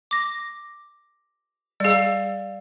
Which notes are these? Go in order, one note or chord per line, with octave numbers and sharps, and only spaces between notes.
D6 A#6
G3 G#4 D5 F5